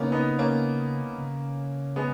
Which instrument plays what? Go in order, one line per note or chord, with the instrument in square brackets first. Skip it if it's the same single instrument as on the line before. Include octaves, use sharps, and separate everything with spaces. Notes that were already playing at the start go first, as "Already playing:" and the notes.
Already playing: [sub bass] C#3 [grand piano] A#3 B3 C#4 D#4
[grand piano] B3 D#4
A#3 C#4
[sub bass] C#3
[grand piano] G#3 B3